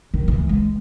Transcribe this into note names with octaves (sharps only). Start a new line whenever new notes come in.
D#3
E3
G#3